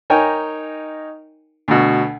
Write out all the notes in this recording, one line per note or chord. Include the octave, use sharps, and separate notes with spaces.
D#4 A#4 C#5 G5 G#5
D2 B2